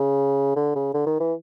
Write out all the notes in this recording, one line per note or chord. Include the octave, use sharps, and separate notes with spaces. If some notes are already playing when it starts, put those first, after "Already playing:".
Already playing: C#3
D3
C#3
D3
D#3
E3